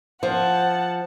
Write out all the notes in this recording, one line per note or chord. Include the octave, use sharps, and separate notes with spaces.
F3 F#5 A5